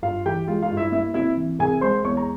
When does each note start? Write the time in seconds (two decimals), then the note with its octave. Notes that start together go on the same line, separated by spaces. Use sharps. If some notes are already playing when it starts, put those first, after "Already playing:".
0.02 G2 F4 F5
0.25 E3 G4 G5
0.48 G#3 F4 F5
0.62 F4 F5
0.70 G2
0.77 E4 E5
0.92 A#3 E4 E5
1.14 C3 E4 E5
1.37 E3
1.59 C2 G#4 G#5
1.81 G#3 C5 C6
2.04 E2 C#5 C#6
2.17 A#5